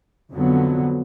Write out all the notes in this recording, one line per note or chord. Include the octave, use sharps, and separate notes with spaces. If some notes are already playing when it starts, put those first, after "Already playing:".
F2 D3 F#3 B3